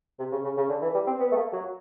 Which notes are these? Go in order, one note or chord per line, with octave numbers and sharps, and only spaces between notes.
C3
C#3
C#3
C#3
D3
E3
G3
C4
B3
A3
A#3
F#3